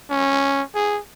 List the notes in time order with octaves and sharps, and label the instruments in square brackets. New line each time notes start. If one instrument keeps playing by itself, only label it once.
[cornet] C#4
G#4